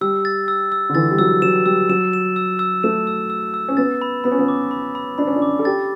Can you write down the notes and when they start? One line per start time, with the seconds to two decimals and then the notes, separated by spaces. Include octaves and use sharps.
0.01 G3 E6
0.25 A6
0.48 E6
0.72 E6
0.89 D3
0.95 E3 A6
1.11 G3
1.19 F#3 E6
1.42 F#3 E7
1.66 G3 E6
1.89 F#3 E7
2.13 E7
2.36 E6
2.59 E6
2.83 A3 E7
3.07 E6
3.30 E6
3.54 E6
3.68 C#4
3.77 B3 A6
4.02 B5
4.24 B3 B5
4.32 C#4
4.39 B3
4.48 D6
4.71 B5
4.95 B5
5.18 D4 B5
5.27 C#4
5.36 D4
5.42 D6
5.59 A4
5.65 G4 A6